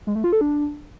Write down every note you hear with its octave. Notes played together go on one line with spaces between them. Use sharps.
G#3
A3
F4
A4
D4